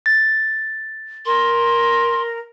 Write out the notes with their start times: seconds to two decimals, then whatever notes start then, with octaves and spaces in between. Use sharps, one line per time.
0.06 A6
1.26 A#4 C6